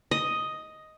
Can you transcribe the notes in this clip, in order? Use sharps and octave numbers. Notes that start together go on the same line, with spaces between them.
D#5